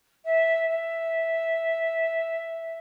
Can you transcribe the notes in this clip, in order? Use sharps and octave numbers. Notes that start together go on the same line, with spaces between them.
E5
E5